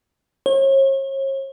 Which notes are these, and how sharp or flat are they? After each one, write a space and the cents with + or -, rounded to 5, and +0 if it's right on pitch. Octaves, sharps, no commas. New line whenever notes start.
C#5 -40